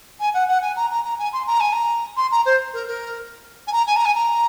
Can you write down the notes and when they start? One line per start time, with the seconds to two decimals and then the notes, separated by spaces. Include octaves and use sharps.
0.19 G#5
0.33 F#5
0.48 F#5
0.61 G#5
0.76 A#5
0.90 A#5
1.04 A#5
1.18 G#5
1.32 C6
1.47 A#5
1.60 G#5
1.72 A#5
2.16 C6
2.31 A#5
2.45 C5
2.73 A#4
2.87 A#4
3.67 G#5
3.72 A#5
3.86 G#5
3.96 A#5
4.05 G#5
4.14 A#5